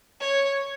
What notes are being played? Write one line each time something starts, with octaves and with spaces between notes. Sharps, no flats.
C#5